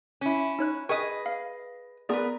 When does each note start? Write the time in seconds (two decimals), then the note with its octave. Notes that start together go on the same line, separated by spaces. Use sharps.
0.21 C#4 E4
0.59 D#4 C#5 F#6
0.89 G#4 A#4 B4 D#5 G5 C#6
1.26 F5
2.09 B3 G#4 A#4 B4 D5